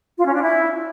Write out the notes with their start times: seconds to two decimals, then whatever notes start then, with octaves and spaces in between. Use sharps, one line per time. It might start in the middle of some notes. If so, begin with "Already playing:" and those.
0.18 F4
0.26 C#4
0.34 D4
0.42 E4